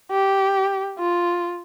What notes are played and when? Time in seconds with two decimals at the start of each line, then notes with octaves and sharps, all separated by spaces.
0.11 G4
0.99 F4